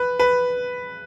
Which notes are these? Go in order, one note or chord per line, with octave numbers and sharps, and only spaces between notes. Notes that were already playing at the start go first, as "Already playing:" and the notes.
Already playing: B4
B4